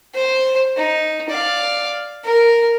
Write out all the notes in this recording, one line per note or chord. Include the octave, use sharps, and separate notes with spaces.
C5
D#4
D5 F5
A#4